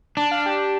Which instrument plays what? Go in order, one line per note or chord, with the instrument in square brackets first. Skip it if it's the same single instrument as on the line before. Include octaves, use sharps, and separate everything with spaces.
[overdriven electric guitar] D4 [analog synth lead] A5
[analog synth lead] F5
G4